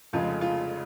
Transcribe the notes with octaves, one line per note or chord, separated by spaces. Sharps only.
F1 F2 C#3 G#3 F4
F4